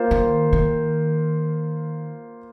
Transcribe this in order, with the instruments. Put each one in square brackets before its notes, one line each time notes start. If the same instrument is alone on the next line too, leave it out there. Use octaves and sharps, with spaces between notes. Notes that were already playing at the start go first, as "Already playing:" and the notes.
Already playing: [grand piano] A#3 F4 C5
[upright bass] D#3
D#3